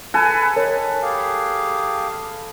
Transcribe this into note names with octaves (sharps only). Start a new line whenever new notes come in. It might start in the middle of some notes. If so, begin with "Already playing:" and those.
A4 B4 G#5
D#3 A#4 C#5
G4 G#4 F5